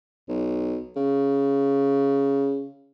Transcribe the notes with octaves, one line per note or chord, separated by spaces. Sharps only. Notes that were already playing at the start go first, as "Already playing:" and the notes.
B1
C#3